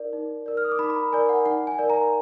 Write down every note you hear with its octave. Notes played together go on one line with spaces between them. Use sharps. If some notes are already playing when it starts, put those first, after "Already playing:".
Already playing: D#4 A#4 D5
D#4
A#4 D5
F6
D#6
D6
D#4 B5
B5
A#5
A#4 D5 G#5
F#5
D#4 F#5
G#5
A#4 D5
A#5